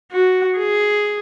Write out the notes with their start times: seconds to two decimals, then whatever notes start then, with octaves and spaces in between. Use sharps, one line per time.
0.12 F#4
0.58 G#4